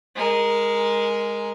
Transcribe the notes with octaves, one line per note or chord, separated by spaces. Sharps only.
G#3 A#4